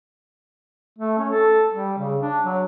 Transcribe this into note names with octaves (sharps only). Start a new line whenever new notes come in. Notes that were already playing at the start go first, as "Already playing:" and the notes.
A3
C#4
A4
G3
C#3
D4
F#3